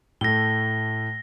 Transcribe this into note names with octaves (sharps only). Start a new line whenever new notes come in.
A2 A3 A#6 G7